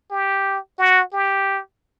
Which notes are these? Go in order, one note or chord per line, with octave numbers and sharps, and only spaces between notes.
G4
F#4
G4